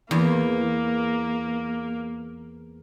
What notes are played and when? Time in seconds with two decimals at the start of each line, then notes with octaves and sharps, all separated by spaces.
0.11 E2 A#3